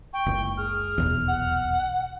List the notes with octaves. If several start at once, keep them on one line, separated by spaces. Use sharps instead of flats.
G5 C#6
F#1 C#2
G#4 F6
D#1 B1 E2
F#5